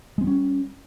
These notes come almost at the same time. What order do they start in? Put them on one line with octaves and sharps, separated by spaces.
G#3 C4 G3 C#4